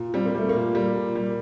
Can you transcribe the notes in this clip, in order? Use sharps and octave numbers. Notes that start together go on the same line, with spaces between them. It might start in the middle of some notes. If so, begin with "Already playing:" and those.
Already playing: A#2
G3 C4
A#3
G3 A3
A#3
A#2
G3
A#2
G3